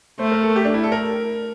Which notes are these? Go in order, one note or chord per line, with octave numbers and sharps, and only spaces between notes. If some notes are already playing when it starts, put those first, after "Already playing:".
A3 C5
A#4
A4
G4
D4
E4
A4
A#4